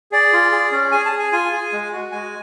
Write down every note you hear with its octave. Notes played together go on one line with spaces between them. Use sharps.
G#4 D5
F4
G#4
C#4
G#4 G#5
A5
G#4
G#5
F4 G#5
G#4
G#3
F#4
G#3 G#5